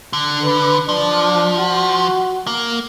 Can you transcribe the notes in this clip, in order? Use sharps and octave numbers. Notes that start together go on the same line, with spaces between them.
D3
B4
F3 D4
F#4
A#3